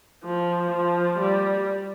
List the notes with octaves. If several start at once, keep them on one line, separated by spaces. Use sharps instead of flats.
F3
F3
G3